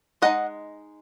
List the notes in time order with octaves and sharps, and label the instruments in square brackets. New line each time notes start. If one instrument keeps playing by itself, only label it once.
[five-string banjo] G#3 D#4 D#5 F#5